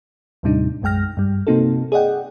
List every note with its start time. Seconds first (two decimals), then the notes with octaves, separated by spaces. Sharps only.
0.43 D#2 A2 C3 G3 D4 D#4
0.82 B1 F#2 G#3 G5 F6 A#6
1.17 G2 G3
1.47 C3 A#3 C4 D#4 F#4 A4
1.92 G#4 D5 D#5 F#5 G5